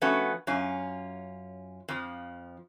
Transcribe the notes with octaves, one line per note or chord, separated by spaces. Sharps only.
F3 A3 B3 C#4 F#4
F#2 C#4 F4 G#5
F2 F3